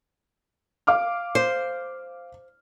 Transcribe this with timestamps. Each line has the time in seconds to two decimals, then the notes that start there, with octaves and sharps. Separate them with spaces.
0.87 F5 D6 F6
1.35 C5